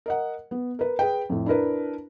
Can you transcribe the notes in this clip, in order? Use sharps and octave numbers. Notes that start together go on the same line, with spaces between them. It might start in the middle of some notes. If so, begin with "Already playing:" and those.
A#4 D#5 F#5
B3
A#4 B4
G#4 B4 G5
F2 A2
D4 E4 A#4 B4